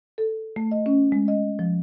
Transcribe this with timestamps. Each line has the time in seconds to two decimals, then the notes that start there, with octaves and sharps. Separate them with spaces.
0.18 A4
0.56 A3
0.71 D#5
0.86 C#4
1.12 G#3
1.28 D#5
1.59 F3